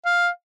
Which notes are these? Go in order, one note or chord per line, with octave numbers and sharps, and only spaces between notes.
F5